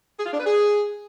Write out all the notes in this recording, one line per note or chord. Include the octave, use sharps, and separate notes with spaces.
G#4
F4
D4
B4
G#4